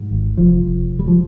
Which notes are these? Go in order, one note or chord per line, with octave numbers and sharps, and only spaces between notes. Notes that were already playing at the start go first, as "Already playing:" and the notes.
Already playing: G#2 G3
G#1
F1 F3
F1
F1
G3
F3